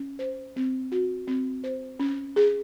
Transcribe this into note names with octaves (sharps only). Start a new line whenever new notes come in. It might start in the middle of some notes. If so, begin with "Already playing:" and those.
Already playing: C#4
C5
C4
F#4
C4
C5
C#4
G#4